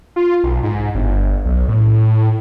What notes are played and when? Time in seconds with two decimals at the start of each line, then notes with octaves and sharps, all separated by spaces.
0.16 F4
0.43 B1
0.63 G#2
0.95 G1
1.45 B1
1.68 A2